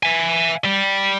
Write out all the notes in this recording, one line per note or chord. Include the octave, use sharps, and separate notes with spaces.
E5 G#5
G3